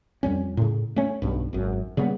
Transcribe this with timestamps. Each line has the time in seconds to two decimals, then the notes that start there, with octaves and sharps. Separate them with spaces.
0.23 F2 G3 C#4
0.57 A2 C#3
0.96 A3 C#4
1.22 B1 G2
1.53 G#1 F#2
1.97 C#3 G3 A#3 B3